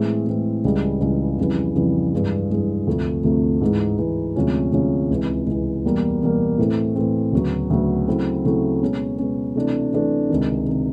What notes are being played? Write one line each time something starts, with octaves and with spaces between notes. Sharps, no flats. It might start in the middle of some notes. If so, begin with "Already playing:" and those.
Already playing: A2 E3 G#3 C4
A2 E3 G#3 C4
C#2 C#3 E3 G3
C#2 C#3 E3 G3
F2 C#3 E3 G3
F2 C#3 E3 G3
G2 E3 G#3
G2 E3 G#3
D2 C3 F3 A3
D2 C3 F3 A3
G#2 E3 G#3
G#2 E3 G#3
D2 C3 F3 G#3 C#4
D2 C3 F3 G#3 C#4
C#2 C3 E3
C#2 C3 E3
E2 B2 G3 A#3
E2 B2 G3 A#3
A2 E3 A3 C4
A2 E3 A3 C4
D2 C#3 F#3 B3
D2 C#3 F#3 B3
C#3 F#3 A3 C4 E4
C#3 F#3 A3 C4 E4
B2 G#3 C#4
B2 G#3 C#4
C3 E3 A3 D4
C3 E3 A3 D4
C#2 C3 D#3
C3 D#3